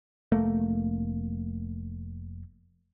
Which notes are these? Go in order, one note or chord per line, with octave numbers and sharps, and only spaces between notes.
F1 A3 A#3